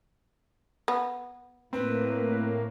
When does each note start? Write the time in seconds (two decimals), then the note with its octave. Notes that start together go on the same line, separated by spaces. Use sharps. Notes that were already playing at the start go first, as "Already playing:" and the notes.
0.88 B3
1.73 A2 A#3 C4 B4